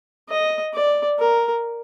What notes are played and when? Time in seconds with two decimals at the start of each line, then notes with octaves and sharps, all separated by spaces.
0.29 D#5
0.74 D5
1.19 A#4